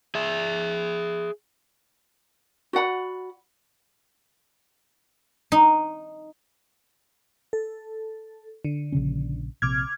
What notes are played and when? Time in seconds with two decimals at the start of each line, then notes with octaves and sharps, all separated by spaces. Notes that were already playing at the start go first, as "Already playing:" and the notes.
0.15 G#4 E5
2.73 F#4 D5 F#5 B5
5.52 D#4
7.53 A4
8.65 D3
8.92 A#1 C#3 C#4
9.62 A#1 C3 D6 F6 G#6